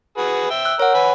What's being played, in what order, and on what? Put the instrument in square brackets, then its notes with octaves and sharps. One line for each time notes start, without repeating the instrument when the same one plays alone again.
[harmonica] F#4 G#4 B4
E5 G5
[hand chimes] E6 F#6
[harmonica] A#4 [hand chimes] C#5 F#5
[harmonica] B4 G#5 B5